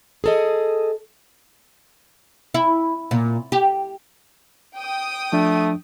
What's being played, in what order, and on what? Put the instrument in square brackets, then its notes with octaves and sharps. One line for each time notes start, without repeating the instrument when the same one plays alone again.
[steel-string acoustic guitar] G#4 A4 D#5
[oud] E4
A#2
G4
[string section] G5 D#6
[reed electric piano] F3 D4 [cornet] A3